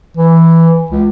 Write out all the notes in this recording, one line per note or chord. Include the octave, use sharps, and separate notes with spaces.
E3
C#2